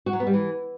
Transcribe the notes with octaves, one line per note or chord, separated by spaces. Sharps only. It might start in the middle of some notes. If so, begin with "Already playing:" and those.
F#4
F#3
B3
G3
E3